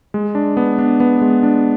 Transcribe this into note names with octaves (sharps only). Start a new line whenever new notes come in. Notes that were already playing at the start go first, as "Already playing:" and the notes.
G#3
D4
B3
D4
B3
G#3
D4